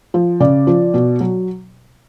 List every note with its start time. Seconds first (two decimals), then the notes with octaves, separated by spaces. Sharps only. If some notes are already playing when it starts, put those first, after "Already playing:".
0.14 F3
0.40 C#3 D5
0.67 F3
0.94 B2
1.20 F#3